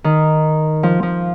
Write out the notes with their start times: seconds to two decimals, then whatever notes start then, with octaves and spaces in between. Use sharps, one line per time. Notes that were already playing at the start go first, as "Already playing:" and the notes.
0.04 D#3
0.83 F3
1.03 F3